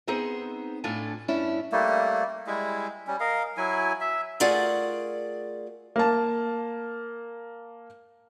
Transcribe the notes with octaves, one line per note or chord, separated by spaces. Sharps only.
B3 C4 D#4 G#4 C5
A2 D4 F4 A4 G#5
G2 C#4 D4 E4
G3 A3 A#3
G3 G#3 E4
G3 C#4
A#4 D#5 F5
F#3 E4 G#5
E5
A3 F4 G#4 A#4 D5 F#5
A#3 A5